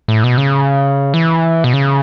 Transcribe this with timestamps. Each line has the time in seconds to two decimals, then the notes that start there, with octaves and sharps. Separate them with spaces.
0.08 A2
0.24 B2
0.38 C#3
1.14 E3
1.64 B2
1.73 C#3